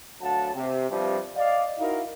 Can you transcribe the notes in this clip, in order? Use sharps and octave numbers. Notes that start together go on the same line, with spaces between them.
D2 F#3 F5 F#5 A5
C3
G2 C3 F3
D5 D#5 F5
D#4 E4 F#4 A#4 F5